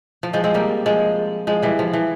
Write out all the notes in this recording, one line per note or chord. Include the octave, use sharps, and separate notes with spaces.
F3
F3 G#3
G#3 C4
G3 A#3
F3 G#3
F3 G#3
E3 G3
F3
E3